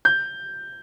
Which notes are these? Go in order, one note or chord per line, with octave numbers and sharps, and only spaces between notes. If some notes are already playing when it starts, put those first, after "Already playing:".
G6